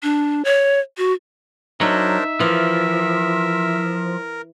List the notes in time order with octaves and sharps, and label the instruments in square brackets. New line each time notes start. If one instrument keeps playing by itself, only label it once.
[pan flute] D4
C#5
F#4
[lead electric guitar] F#3 [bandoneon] D4 A#4 C5 [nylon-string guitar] D#4 [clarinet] E5
[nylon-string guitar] E3 [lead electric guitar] F3 [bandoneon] A#4